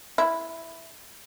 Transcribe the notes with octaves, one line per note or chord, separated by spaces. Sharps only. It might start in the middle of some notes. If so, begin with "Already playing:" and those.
E4